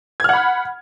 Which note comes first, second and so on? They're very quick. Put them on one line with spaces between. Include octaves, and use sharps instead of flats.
G#6 F6 F#5 B5